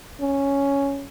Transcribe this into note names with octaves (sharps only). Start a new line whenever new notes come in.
C#4